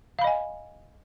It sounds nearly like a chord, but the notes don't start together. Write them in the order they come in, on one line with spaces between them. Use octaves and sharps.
F5 B5 D#5 G#5